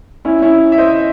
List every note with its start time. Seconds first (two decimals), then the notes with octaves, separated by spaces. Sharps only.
0.25 C#4 E4
0.42 C#4 E4
0.72 E5
0.78 C5 D#5